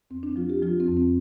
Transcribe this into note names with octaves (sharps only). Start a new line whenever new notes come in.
F2 C4
D4
F3 F4
G4
F3 F4
C4
F2
C4